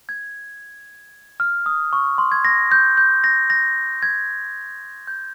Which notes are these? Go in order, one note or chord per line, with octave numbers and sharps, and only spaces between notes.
G#6
F6
D#6
C#6
C6
G#6
A#6
G6
G6
A#6
A#6
G#6
G6